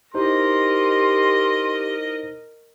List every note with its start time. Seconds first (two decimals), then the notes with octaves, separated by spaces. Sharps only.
0.15 D#4 E4 G4 A#4 C5 D#5 C6